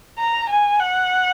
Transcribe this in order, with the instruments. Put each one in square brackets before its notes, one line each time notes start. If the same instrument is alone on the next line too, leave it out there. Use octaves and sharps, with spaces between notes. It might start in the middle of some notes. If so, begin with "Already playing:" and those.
[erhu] A#5
G#5
F#5